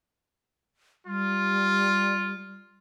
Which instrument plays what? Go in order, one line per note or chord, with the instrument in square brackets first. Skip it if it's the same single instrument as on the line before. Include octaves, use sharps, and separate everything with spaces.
[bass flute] G3 [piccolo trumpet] F4